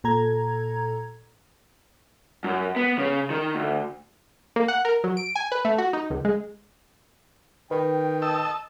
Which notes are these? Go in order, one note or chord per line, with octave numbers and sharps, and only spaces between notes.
A#2 A4 A#5 G#6
F#2
B3
C#3
D#3
D2
A#3
F#5
A#4
F#3
D7
G#5
B4
A3
F#4
D#4
C#2
G#3
D#3 B4 G5
D#5 A5 E6